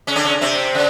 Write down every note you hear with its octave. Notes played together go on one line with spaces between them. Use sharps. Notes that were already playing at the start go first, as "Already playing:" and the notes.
C#3 C#4
D3 D4
C#3 C#4
C3 C4
C#3